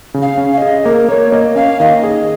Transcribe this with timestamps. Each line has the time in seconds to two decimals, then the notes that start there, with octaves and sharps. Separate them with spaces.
0.14 C#3
0.22 F5
0.38 C#4
0.54 F5
0.58 G#4 D#5
0.85 A#3 A#4
1.09 A#3 C#5
1.32 A#3 D#5
1.56 C#4 F5
1.80 D#3 D#5
2.03 G#4